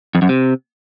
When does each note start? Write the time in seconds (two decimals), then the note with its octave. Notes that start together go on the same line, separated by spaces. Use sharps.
0.15 F2
0.22 F#2
0.29 C3